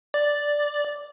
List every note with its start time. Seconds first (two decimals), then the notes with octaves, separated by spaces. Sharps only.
0.14 D5